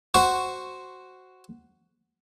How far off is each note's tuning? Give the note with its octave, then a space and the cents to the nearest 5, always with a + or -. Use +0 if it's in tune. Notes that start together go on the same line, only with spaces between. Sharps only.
F#4 +5 C5 +0 C#6 +0